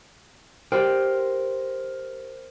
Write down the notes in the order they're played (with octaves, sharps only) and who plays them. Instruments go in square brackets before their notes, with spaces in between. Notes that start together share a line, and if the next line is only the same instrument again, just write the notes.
[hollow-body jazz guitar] G4 D5 G5 [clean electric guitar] A#4 C5